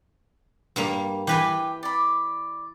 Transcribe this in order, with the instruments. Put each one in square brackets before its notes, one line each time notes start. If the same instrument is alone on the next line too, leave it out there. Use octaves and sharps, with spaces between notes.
[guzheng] G2 G3 A#3
[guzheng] E3 B4 G#5 [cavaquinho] G4 G5 B5
[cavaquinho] D5 B5